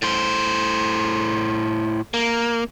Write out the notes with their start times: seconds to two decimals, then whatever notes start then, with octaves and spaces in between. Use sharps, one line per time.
0.02 A2 C5
2.14 A#3